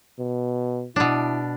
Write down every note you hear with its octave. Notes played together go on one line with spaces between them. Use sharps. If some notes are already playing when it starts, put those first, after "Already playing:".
B2
B2 D4 E4